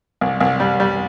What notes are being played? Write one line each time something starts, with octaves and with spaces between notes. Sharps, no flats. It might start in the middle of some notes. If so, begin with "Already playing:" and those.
C2
C2
G3
G3